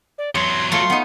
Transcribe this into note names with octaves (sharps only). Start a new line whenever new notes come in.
D5
E2 F#3 C#5 C6
A3 F4 C#5 C6
B3 D#4